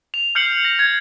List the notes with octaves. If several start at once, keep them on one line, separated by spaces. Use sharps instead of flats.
F7
F6 G6 C7 C#7 F#7
A#6
G#6